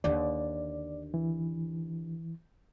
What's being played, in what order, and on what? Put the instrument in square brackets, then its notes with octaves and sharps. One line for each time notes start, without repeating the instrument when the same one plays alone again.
[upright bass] D#2 D3 [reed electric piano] D5
[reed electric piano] E3